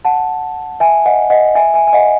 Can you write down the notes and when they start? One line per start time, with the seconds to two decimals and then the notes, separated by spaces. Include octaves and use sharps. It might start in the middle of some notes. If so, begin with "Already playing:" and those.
0.05 F#5 A5
0.80 E5 G#5
1.06 D#5 F#5
1.30 D#5 F#5
1.55 E5 G#5
1.74 E5 G#5
1.87 G#5
1.93 D#5 F#5